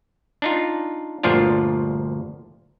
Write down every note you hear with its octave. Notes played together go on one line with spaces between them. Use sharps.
D4 D#4 F4
G1 D2 A#2 F3 D4 F4